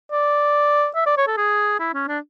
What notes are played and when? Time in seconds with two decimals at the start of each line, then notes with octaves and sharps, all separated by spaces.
0.12 D5
0.96 E5
1.06 D5
1.17 C#5
1.27 A4
1.37 G#4
1.80 E4
1.94 C#4
2.08 D4